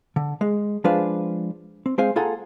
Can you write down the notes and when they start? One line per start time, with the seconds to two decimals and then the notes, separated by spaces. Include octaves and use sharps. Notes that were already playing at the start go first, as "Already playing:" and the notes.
0.16 D3
0.41 G#3
0.84 F3 G#3 D4 F4 B4 C5
1.86 C4
1.98 G#3 C4 C5 F5 G#5
2.16 A#3 F4 G#4 A4 F#5 A#5